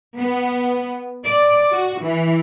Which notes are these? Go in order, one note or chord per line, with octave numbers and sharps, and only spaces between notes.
B3
D5
F#4
E3